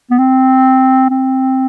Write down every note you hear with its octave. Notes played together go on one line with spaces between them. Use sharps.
B3
C4
C4